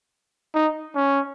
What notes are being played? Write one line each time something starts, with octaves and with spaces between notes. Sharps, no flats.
D#4
C#4